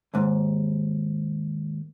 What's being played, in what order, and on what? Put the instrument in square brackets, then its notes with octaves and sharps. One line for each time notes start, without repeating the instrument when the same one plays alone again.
[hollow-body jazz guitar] D#2 G#2